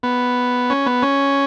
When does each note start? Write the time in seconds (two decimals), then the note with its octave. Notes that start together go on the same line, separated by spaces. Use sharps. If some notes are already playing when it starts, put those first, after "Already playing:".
0.03 B3
0.70 C#4
0.86 B3
1.03 C#4